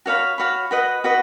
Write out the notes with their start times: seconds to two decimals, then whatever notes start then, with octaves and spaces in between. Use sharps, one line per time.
0.06 F#4 C#5 F5 B5
0.38 F#4 C#5 F5 B5
0.71 F#4 B4 D#5 F#5
1.04 F#4 B4 D#5 F#5